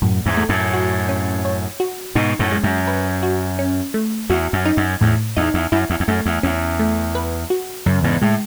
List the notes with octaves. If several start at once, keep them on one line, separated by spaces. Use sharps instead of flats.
F#2 A2
E2 G#2
A3
F#2 A2
F#4
C#4
C#5
F#4
G#2 B2 D#4
F#2 A2
G#3
F#2
B4
F#4
C#4
A3
E2 F#4
F#2
D#4
F#2
E2 A2
E2 D#4
E2
F#2 E4
E2
E2
F#2 A3
E2
E2 C#4
A3
B4
F#4
F#2 C#3
E2 G#2
A2 G#3